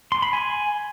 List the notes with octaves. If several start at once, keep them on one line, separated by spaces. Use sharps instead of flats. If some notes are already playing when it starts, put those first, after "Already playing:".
C6
B5
G#5